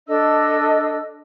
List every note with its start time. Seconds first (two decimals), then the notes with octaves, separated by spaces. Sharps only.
0.07 D4 A4 D#5 E6